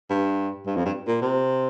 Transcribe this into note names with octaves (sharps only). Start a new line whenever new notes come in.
G2
G2
F2
G2
A#2
C3